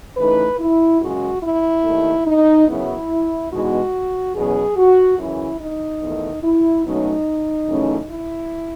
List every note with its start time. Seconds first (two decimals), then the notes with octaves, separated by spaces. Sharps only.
0.17 C#3 E3 A3 D#4 B4
0.59 E4
1.01 F#2 C#3 G#3 F#4
1.43 E4
1.84 D#2 D#3 A3
2.26 D#4
2.67 F#2 C#3 F#3 B3 E4
3.51 E2 B2 G#3 B3 D#4 F#4
4.35 E2 B2 F#3 C#4 G#4
4.76 F#4
5.18 F#2 C#3 E3 E4
5.59 D#4
6.01 E2 D#3 A3
6.43 E4
6.85 B2 F#3 A3 C#4 D#4
7.69 F#2 C#3 E3 A3 C#4
8.10 E4